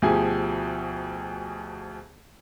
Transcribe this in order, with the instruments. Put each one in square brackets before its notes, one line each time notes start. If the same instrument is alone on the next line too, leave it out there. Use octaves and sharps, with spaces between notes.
[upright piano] D2 B2 F3 G4 G#4 G#5